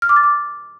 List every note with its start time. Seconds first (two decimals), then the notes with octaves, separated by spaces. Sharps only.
0.02 F6
0.09 D6
0.16 A6
0.23 D6